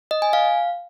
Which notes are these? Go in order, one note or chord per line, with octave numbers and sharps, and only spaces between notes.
D#5
G#5
F5